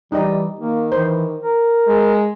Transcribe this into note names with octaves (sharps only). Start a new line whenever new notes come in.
E3 G3 D#4 G4 D#5
D#3 A#3
E3 C5
A#4
G#3